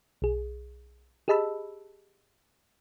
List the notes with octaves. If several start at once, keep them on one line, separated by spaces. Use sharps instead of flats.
B1 G#4
G4 G#4 D#5 A5 B5 E6